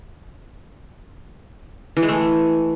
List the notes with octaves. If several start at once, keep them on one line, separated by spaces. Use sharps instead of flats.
E3
G#3
A3